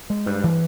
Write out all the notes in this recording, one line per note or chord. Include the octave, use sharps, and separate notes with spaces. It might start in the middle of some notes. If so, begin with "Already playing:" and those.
G#3
G2
E3